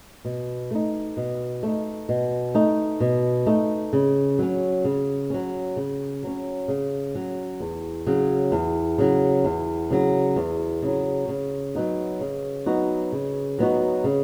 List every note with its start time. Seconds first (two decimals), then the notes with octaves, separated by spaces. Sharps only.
0.25 B2
0.71 A3 D#4
1.17 B2
1.63 A3 D#4
2.09 B2
2.55 A3 D#4
3.00 B2
3.46 A3 D#4
3.93 C#3
4.39 F#3 C#4
4.84 C#3
5.30 F#3 C#4
5.76 C#3
6.23 F#3 C#4
6.68 C#3
7.15 F#3 C#4
7.60 E2
8.07 C#3 F#3
8.52 E2
8.98 C#3 F#3
9.45 E2
9.90 C#3 F#3
10.36 E2
10.82 C#3 F#3
11.28 C#3
11.75 F#3 B3 D#4 F#4
12.20 C#3
12.66 F#3 B3 D#4 F#4
13.12 C#3
13.58 F#3 B3 D#4 F#4
14.04 C#3